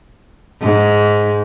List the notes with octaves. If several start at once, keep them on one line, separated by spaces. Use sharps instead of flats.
G#2